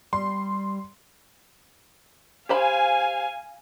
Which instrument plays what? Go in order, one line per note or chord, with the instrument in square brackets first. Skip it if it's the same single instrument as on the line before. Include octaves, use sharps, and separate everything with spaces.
[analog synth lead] G3 [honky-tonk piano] C6
[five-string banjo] G4 C5 B5 [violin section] F5 G#5